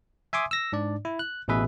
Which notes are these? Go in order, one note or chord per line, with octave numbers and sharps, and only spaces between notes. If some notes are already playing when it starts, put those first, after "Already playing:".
E5 G#5 C6 D6 D#6
E6 A#6
G#2 D4 D5
E4
F#6
A1 B2 E3 G#4 B4 E5